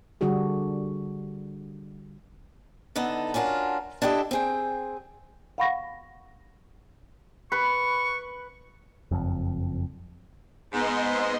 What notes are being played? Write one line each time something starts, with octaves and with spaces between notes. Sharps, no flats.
D3 G3 D4 F#4 G#4
D3 B3 D#4 E4 A4
C#4 D4 F4 F#4 A#4
D4 E4 G4 A4 D#5
C4 G#4 G5
F5 F#5 B5 C#6 A#6
B4 C#6
F#1 F2
G#2 B3 D#5 C6